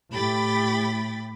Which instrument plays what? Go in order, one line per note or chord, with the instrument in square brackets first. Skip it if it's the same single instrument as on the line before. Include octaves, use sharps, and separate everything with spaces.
[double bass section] A2 [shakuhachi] G4 [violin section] G5 B5 A6